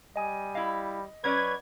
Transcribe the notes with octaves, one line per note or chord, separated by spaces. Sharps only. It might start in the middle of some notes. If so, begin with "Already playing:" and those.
G3 D#5 G#5 D#6
E4 D#5 F5
F#3 C#4 B4 D5 G#6